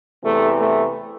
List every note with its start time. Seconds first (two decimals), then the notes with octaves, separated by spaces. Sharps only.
0.23 E2 C3 E3 A3
0.59 A3